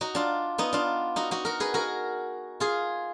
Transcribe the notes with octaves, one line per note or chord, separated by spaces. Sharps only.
D#4 F#4
D4 F4
B3 D#4
D4 F4
D#4 F#4
D#4 F#4
F#4 A#4
G#4 B4
F#4 A#4
F4 G#4